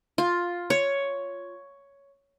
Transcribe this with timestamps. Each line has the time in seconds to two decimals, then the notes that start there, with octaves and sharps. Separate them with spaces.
0.18 F4
0.70 C#5